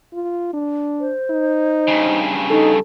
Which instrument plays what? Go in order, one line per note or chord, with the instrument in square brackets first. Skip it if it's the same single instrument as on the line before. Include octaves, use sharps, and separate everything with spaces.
[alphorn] F4
D4
[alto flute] C5
[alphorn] D#4
[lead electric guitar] G2 C#3
[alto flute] D#4 [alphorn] A4